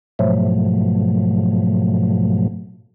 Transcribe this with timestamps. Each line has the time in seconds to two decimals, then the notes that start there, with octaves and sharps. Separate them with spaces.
0.19 G#2 B2 F3 F#3 A3